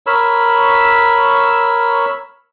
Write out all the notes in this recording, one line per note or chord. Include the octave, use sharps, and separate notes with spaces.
A#4 C#5 B5 E6